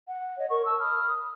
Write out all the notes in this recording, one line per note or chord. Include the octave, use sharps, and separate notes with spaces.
F#5
C#5 D#5
A#4 C#6
A5 E6
B5 D#6 F6